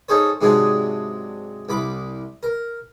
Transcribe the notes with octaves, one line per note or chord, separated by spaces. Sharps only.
C#4 D#4 G#4 A4 C5 C#5
G#2 C3 F#3 G#3 D4 G#4
C2 B5 D6
A#4